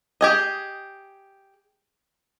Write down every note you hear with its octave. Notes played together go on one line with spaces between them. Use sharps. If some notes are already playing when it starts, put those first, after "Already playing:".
G4 G#4 D#5